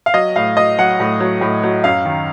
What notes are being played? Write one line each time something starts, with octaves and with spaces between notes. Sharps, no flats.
F5
F#3 D#5
A2 F5
F#3 D#5
F#3 F#5
A2
F#3
A2
F#3
F#2 F5
D#3